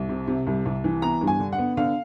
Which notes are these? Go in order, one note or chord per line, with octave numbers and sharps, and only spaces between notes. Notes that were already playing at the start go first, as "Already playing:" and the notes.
Already playing: C2
C3
C3
C2
C2
E3
B3 A#5
G2
G#5
D3
F#5
B3
D3 F5